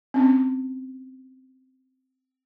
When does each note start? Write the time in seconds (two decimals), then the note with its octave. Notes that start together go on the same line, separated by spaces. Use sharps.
0.14 C4 C#4